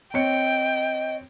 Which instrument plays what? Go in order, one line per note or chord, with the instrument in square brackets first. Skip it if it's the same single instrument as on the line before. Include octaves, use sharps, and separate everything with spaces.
[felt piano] C4 C#5 C#7 [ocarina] D#5 [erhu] G5